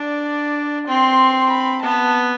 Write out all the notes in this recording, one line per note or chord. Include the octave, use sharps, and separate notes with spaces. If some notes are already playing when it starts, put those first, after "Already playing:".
Already playing: D4 D5
C4 C6
B5
B3 A5